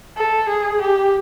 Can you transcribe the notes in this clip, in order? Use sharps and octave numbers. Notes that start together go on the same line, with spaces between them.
A4
G#4
G4